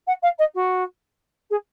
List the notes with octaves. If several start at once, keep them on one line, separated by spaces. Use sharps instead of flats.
F#5
F5
D#5
F#4
G#4